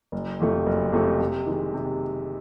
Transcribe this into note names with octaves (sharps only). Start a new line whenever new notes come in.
F#1
F2 C3 F3 A3
F#1
F2 C3 F3 A3
C3
D#3 G#3
C3